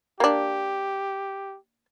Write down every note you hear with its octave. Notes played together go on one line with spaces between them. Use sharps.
A#3 D4 G4